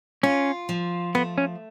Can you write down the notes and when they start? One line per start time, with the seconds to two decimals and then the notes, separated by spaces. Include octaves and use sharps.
0.23 C#4 F4
0.69 F3
1.15 A3 B3
1.38 C#4